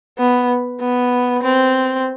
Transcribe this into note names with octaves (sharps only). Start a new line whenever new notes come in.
B3
B3
C4